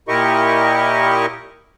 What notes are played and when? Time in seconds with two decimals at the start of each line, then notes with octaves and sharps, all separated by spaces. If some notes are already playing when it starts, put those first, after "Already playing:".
0.08 A#2 E4 G4 A#4 D#5 C#6